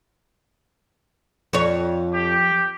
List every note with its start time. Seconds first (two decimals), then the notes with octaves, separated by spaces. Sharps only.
1.53 F2 F3 C#5
2.14 G4